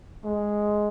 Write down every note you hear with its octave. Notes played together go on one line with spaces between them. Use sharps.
G#3